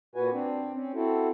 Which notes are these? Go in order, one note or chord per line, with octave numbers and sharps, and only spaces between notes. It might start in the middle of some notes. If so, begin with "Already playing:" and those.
A#2 F#4 B4 G#5
C4 D4
C4 C#4
C4 E4 F#4 A4